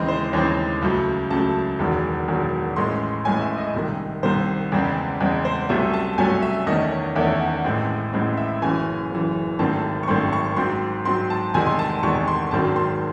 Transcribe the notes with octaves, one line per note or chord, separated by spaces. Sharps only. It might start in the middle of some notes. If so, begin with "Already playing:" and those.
Already playing: D#2 C#3 E3 G#3 C4 D#5
C5
D#2 C#3 E3 G#3 C4 C#5
C#2 C#3 F#3 A3
C#2 C#3 F#3 A3 A5
E1 E2 D#3 F#3
E1 E2 D#3 F#3
A1 A2 G#3 C#4 C6
A1 A2 G#3 C#4 G#5
E5
D#5
C2 C3 D#3
C2 C3 D#3 C5
E2 C#3 G#3 C4
E2 C#3 G#3 C4
C5
C2 C3 F#3 A3 C#4 E5
A5
C2 C3 F#3 A3 C#4 G#5
E5
E2 D#3 A3 C#4 D#5
C#5
E2 D#3 A3 C#4 E5
F#5
A1 A2 G#3 C4
A1 A2 G#3 C4
E5
F#1 F#2 E3 G#5
F#1 F#2 E3
G#1 F#2 D#3 A3 C4 A5
C#6
G#1 F#2 D#3 A3 C4 C6
C#6
G#2 F#3 C4 C6
G#2 F#3 C4 C6
A5
E2 C3 D#3 G#3 G#5
C6
A5
E2 C3 D#3 G#3 C#6
C6
G#1 F#2 D#3 F#3 C4 A5
C6